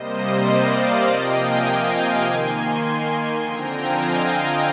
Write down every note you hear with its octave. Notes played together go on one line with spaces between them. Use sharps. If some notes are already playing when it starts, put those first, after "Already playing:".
Already playing: C3 G3 A#3 C5 D#5
D5 F5
C3 F3 A#3 D#5 G5
F5 G#5
F5 G#5
D#3 A#3 G#5 C6
D3 F3 C4 G5 A#5
F5 G#5
D#5 G5